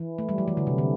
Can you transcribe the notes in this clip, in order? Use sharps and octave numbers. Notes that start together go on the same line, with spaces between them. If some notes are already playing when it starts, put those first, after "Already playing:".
Already playing: E3
A3
G3
F#3
E3
D3
C3
D3